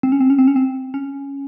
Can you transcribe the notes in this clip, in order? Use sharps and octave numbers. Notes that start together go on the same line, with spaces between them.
C4
C#4
C4
C#4
C4
C#4
C4
C#4